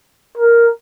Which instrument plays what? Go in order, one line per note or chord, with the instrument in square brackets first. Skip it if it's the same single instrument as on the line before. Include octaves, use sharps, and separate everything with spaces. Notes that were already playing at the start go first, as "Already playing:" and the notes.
[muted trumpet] A#4